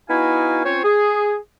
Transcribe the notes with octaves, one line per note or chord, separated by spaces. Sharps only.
B3 D#4 E4 F#4 F5 G#5
C4 C#4 F4 C5 C#5
G#4